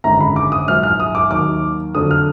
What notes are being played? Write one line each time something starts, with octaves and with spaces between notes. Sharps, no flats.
G#1 F#2 D3 G#3 D#4 A#5
B5
D6
D#6
A#1 G#2 F#3 F6
F6
D#6
D6
D#2 D#3 F#3 D6
F2 D3 F#3 D4 D#6
F6